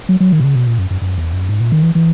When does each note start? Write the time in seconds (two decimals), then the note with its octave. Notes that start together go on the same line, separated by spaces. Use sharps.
0.09 F#3
0.20 F#3
0.32 D#3
0.40 B2
0.44 C#3
0.55 B2
0.67 A#2
0.79 F#2
0.91 F#2
1.02 F#2
1.18 E2
1.33 F#2
1.49 G#2
1.60 A#2
1.72 D#3
1.82 E3
1.95 E3